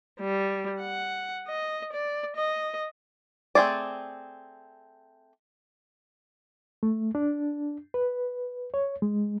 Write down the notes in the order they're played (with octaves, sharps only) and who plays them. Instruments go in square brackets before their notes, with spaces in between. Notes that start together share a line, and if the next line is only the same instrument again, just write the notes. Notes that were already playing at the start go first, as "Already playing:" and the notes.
[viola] G3
F#5
D#5
D5
D#5
[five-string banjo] A3 C4 F4 G#4 D5
[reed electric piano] A3
D4
B4
C#5
G#3